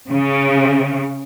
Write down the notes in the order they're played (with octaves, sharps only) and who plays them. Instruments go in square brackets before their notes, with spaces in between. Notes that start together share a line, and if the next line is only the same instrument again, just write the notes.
[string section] C#3